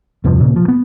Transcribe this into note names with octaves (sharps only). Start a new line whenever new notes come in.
E2 G2 C3 F3
A#2 C#3
F3
B3